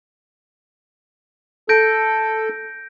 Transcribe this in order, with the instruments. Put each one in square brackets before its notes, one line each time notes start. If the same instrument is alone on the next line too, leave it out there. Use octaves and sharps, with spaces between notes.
[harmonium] A4 [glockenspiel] G6 A#6 D7